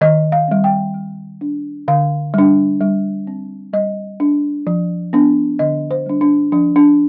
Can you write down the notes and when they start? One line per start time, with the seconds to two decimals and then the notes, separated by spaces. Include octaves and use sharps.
0.01 D#3 D#5
0.32 F5
0.48 G3 C4
0.64 G5
0.94 G3
1.41 D4
1.88 D3 F5
2.34 G3 D4
2.81 G3
3.27 C4
3.73 G3 D#5
4.20 D4
4.67 F3
5.13 B3 D4
5.59 D3 D#5
5.91 C5
6.06 G3 D4
6.21 D4
6.52 F3 D4
6.76 D4